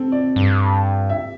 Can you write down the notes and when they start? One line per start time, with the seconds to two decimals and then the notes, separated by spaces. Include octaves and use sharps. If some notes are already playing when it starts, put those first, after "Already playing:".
Already playing: C4 A4
0.12 D5
0.36 G2
1.10 E5